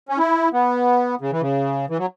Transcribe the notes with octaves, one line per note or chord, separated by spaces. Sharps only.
C#4
E4
B3
C#3
E3
C#3
E3
F#3